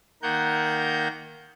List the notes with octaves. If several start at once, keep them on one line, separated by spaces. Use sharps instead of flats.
D#3 A#3 A#4 F#5 G6